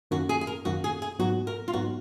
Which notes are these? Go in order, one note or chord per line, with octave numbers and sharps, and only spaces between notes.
F#2 D#3 A#3 C#4 F#4
G#4
G#4
A#4
F#2 D#3 A#3 C#4 F#4
G#4
G#4
G#2 F#3 B3 D#4 F#4
A#4
F4
G#2 F#3 B3 D#4 F#4